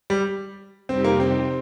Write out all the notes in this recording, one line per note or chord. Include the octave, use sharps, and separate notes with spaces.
G3
F2 C3 G3 C4 D#4 G4
A#3
C4